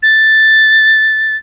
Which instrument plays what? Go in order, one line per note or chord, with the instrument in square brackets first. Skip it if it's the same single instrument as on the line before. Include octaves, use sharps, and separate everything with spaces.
[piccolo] A6